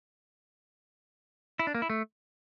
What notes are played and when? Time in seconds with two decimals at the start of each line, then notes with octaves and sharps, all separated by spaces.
1.59 E4
1.67 D4
1.75 A#3
1.82 E4
1.90 A3